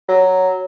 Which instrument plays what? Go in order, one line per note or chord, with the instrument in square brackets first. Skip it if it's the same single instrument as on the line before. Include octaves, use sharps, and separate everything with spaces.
[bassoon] F#3